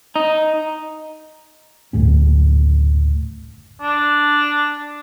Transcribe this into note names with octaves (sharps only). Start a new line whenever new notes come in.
D#4
F#1 D2 A2 C#4
D4